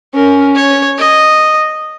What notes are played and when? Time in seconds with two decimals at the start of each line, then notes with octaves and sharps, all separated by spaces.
0.14 C#4 A#4
0.55 C#5
0.98 D#5